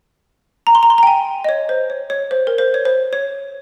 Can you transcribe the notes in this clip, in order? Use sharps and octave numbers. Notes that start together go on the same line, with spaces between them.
A#5
C6
A#5
C6
A#5
G5
G#5
D#5
C#5
C5
C#5
C#5
C5
A#4
C5
C#5
C5
C#5